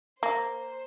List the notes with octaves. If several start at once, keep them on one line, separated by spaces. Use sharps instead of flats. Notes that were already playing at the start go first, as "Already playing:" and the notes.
A#3 C5